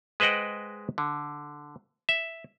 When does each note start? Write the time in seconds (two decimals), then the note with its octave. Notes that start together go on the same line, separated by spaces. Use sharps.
0.20 G#3 B4 C5 D#5 F#5 G5
0.98 D3
2.09 E5